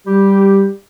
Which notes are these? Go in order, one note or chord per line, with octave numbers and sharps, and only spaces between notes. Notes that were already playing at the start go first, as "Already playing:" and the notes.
G3 G4